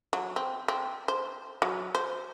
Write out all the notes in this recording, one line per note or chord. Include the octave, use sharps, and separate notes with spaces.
F#3
C4
C4
C5
F#3
C5